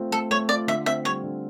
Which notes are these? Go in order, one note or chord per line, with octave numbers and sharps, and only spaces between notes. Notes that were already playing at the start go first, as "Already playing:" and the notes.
Already playing: A3 C4 F4
A3 A4
A3 C#5
F4 D5
D3 E5
C4 E5
G3 C#5
D3